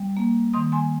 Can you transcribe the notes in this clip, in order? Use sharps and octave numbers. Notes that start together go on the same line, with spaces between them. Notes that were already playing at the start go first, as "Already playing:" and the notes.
Already playing: G3
A#3
D#3 C6 D#6
G#5 C6